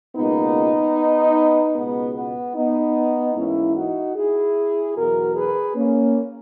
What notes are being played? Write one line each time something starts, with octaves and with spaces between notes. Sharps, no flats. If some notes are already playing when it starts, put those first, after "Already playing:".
C#2 B2 A#3 B3 D#4
C#2 B2 G#3 B3
B3
B3 D#4
G#2 E3 A#3 C#4 E4
D#4 F#4
E4 G#4
E2 B2 F#3 F#4 A#4
G#4 B4
A#3 C#4